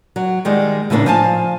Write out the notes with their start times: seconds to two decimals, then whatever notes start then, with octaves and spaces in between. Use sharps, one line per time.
0.16 F#3
0.45 D#3 G3 G#3
0.90 A2 C#3 E3 B3 D4 D#4
1.06 F3 F5 G#5 A5